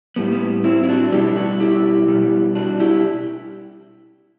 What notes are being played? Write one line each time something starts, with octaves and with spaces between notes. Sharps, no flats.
A2 G3 B3
B3
C4 E4
E4
D4 F#4
B2 G3 B3 E4 G4
F#4 A4
E4 G4
B2 G3 B3
D4 F#4
E4 G4